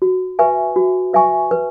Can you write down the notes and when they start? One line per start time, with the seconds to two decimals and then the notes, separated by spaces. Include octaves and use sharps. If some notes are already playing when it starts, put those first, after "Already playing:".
0.02 F#4
0.39 B4 E5 G#5 C#6
0.76 F#4
1.14 B4 E5 G#5 C#6
1.51 B4